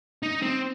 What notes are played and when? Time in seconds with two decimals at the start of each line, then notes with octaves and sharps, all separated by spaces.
0.23 D#4
0.42 C4